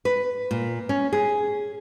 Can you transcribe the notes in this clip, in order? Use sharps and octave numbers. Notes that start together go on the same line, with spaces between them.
B4
A#2
C#4
G#4